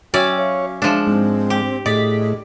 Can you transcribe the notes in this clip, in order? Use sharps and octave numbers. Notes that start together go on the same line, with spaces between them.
F#3 C#4 D5 E5 G5
C#5 F5
F3 G#3 D4
G#2 C4
G4
A2 G#4 D5 D#5 B6